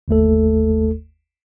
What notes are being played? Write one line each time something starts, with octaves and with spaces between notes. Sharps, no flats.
G1 D#2 A3 A4